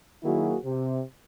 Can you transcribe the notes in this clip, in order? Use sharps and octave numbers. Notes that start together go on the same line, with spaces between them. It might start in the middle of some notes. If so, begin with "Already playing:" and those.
D#3 F#3 A#3 E4 F#4 G#4
C3